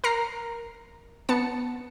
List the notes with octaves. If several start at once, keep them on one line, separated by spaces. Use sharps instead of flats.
A#4 A#5 C7
B3 A5 C#7